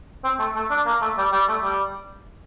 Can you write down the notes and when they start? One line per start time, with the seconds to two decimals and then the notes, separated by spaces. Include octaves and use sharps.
0.24 C4
0.39 A3
0.56 A3
0.71 D4
0.86 A#3
1.01 A3
1.18 G3
1.32 G3
1.49 A3
1.64 G3